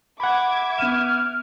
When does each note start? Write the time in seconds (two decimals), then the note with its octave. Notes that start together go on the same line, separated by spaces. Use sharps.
0.20 E5 F#5 B5 D6 G#6
0.78 B3 F6 D#7 E7